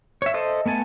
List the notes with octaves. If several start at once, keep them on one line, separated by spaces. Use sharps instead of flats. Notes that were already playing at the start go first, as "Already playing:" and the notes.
C#5 E5
A4 C5 D#5 E5
A3 B3 G#5 A5